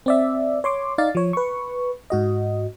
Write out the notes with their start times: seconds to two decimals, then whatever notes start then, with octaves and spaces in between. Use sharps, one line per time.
0.06 C4 D5 E5
0.64 C#5 C6 D6
0.98 D#4 D5 F5 A6
1.15 F3 C#5
1.33 B4 C#6
2.10 G#2 F#4 D#5